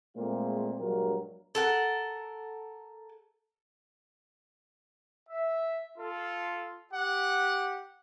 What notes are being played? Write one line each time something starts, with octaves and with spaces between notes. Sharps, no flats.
A#2 G#3 A3 C4 F4 G#4
A#1 G2 F#3 G#3 A#4
A4 A#4 F#5
E5
F4 A4
G4 F#5